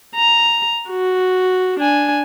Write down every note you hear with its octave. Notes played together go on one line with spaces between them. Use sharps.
A#5
F#4
D4 G#5